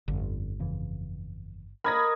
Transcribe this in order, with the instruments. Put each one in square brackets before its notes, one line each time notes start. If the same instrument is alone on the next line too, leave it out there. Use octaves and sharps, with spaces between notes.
[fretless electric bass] G1 [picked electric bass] F2 D3
[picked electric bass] F2 C#3 E3
[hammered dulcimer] A#4 D#5 [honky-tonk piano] B5 G#6 A#6